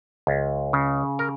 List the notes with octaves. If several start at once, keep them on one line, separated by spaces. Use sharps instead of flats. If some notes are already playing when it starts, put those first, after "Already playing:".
C#2
C#3
A#4